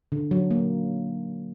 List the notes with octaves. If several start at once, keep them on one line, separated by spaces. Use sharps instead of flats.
D3
F#3
A#3